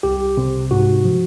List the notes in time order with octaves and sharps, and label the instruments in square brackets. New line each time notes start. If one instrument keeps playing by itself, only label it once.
[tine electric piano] C2 G4
C3
G#2 F#4
F3